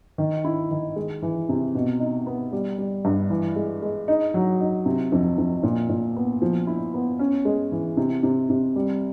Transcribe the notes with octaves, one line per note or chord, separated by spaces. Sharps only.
D#3
E4
D#3
G#3
E3
C3
B2
D#4
B3
G3
G3
G2
E3
G#3
G#3
D#4
F#3
D#4
C3
F2
F2
A#2
A#2
B3
F3
E4
B3
C#4
G#3
E3
C3
C3
C3
G3